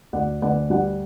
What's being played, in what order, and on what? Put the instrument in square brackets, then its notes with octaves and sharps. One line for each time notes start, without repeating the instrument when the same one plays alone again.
[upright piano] D2 D5 F#5
D2 D5 F#5
G3 D5 F#5